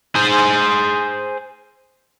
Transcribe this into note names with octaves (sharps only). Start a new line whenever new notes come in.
G#4 C5